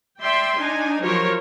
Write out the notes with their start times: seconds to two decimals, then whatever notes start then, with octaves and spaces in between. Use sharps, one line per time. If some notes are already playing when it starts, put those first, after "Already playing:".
0.20 D5 E5 G5 C6
0.58 D4 D#4 G#5
1.02 F3 F#3 G4 A#4 C5 C#5